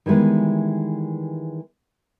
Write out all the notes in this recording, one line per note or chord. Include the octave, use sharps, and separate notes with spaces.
D#3 E3 G3 G#3 B3